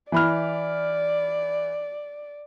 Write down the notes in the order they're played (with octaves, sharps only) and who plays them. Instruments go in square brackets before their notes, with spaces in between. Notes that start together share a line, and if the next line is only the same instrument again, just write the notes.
[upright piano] E3 B5 F6 [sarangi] D5